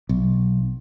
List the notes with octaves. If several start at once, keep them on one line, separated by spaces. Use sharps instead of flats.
B1